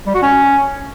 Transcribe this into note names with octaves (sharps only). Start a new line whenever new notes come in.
G3
F#4
C#4